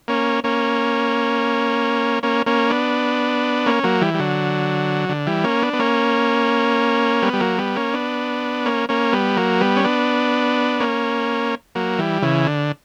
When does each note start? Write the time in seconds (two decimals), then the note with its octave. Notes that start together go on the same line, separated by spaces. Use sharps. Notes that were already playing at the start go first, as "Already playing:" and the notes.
0.08 A#3 C#4
0.44 A#3 C#4
2.23 A#3 C#4
2.46 A#3 C#4
2.70 B3 D4
3.66 A#3 C#4
3.83 F#3 A#3
4.01 E3 G3
4.14 G3
4.19 D3 F#3
5.09 D3
5.27 E3 G3
5.44 A#3 C#4
5.62 B3 D4
5.73 B3
5.79 A#3 C#4
7.22 G3 B3
7.33 G3
7.40 F#3 A#3
7.58 G3 B3
7.76 A#3 C#4
7.94 B3 D4
8.66 A#3 C#4
8.89 A#3 C#4
9.13 G3 B3
9.37 F#3 A#3
9.61 G3 B3
9.76 C#4
9.84 B3 D4
10.80 A#3 C#4
11.75 F#3 A#3
11.98 E3 G3
12.22 C#3 E3
12.47 D3